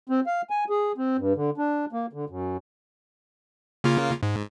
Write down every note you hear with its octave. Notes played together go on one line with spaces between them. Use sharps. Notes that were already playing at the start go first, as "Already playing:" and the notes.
C4
F5
G#5
G#4
C4
G2
D3
D4
A#3
D3
F#2
C#3 A#3 F4
G#2